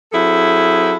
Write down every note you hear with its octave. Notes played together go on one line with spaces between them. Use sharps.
F#3 C4 E4 G#4 A4